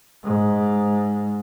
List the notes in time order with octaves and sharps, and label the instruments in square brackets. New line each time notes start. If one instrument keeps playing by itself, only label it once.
[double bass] G#2